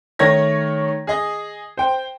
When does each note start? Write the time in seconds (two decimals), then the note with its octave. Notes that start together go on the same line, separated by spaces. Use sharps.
0.19 D#3 A3 C#5 G#6 A#6
1.07 G#4 D#5
1.77 C5 G5